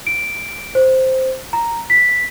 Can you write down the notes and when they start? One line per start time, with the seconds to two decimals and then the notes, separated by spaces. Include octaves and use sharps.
0.07 D7
0.75 C5
1.53 A#5
1.90 B6